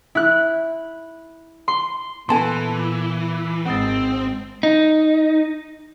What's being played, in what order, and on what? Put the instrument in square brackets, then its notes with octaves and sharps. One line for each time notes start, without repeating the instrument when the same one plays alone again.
[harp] E4 F#6
C6
[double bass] A#2 [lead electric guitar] E3 [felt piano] B3 A4 D#7 [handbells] G#5 A5 C6
[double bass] G#1 G#3 [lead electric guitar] C4 [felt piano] F#5 D#6 A6
[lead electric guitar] D#4